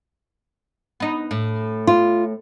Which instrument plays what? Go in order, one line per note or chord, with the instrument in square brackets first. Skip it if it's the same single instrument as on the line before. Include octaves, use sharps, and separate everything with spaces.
[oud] B3 D#4
A2
[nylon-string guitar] F4